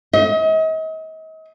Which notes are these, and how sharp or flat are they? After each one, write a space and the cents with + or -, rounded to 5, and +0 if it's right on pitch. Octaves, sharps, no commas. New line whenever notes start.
D#5 +40